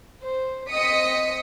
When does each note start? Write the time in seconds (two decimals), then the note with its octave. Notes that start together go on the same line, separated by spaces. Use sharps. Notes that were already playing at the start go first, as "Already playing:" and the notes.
0.23 C5
0.69 C4 D#5 D#6 B6 C#7